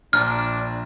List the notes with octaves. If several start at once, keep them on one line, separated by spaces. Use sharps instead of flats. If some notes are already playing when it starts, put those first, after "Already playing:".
A#1 D4 A#5 F6